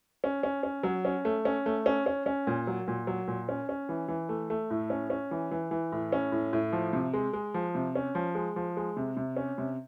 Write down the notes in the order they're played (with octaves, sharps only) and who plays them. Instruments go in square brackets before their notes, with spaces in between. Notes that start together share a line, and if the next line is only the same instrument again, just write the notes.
[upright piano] C#4
C#4
C#4
F#3
C#4
A3
C#4
A3
C#4
C#4
C#4
A#2
F#3
A#2
F#3
A#2
C#4
C#4
E3
E3
A3
A3
A2
C#4
C#4
E3
E3
E3
A2
C#4
A2
A2
F3
C3
G#3
G#3
F3
C3
C#4
F3
G#3
F3
G#3
C3
C3
C#4
C3